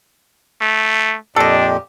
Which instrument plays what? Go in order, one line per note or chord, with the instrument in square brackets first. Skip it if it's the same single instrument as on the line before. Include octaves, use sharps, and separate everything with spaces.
[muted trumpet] A3
[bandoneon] F2 A#2 G4 [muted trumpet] D4 [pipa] A4 D#5